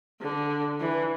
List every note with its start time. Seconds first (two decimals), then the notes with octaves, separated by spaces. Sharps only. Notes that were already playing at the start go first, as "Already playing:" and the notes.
0.21 D3
0.80 E3